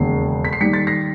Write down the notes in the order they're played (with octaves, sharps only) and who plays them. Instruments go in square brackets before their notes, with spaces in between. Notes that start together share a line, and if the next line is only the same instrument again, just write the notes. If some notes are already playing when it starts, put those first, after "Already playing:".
Already playing: [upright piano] E1 D#2 C#3 C7
B6
C7
D#2 D#3 G3 B6 C#7
A6 B6
A#6 C7